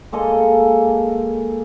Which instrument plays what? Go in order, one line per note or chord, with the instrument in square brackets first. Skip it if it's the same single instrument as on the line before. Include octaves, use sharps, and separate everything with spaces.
[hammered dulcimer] G#3 A#3 A4 D#5